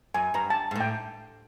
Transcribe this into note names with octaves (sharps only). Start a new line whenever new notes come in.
F#2 G#5
G2 A#5
A5
G#2
A2 G5